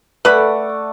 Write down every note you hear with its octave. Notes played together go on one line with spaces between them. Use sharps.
A3 B4 D5 F#5 B5